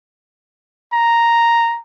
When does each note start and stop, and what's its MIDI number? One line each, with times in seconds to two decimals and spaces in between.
0.93 1.79 82